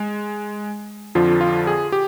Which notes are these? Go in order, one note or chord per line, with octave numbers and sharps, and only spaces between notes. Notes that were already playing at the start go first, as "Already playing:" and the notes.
Already playing: G#3
F2 D3 F3 F4
F4
G#4
G4